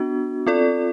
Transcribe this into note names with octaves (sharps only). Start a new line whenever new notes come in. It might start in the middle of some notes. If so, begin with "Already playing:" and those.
Already playing: B3 D4 F#4
C4 F4 A4 D5